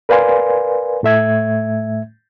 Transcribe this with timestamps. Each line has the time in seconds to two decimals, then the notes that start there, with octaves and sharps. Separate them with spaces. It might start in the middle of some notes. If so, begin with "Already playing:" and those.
0.09 A#4 B4 D5 F5 G#5 C6
1.03 A2 A3 E5 G#6